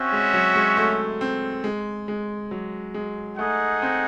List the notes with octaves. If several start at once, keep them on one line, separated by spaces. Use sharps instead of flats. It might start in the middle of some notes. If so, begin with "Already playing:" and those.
Already playing: C4 C#4 F#4 C#5 E5
G#3
F#3
G#3
A3
C4
G#3
G#3
F#3
G#3
A3 D#4 G#4 D#5 F#5
C4